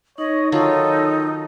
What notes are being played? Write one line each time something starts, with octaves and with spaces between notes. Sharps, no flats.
D#4 C#5 D#5
D#3 F#3 D#4 F4 A4 D#5